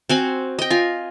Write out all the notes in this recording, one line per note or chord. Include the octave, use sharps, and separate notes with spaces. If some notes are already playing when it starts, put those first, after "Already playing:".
C4 F#4 G#5
D#5 G5
F4 G#5